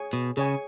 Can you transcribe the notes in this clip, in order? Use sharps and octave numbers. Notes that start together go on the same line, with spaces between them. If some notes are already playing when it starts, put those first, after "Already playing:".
Already playing: G#4 C#5 G#5
B2
C#3 G#4 C#5 G#5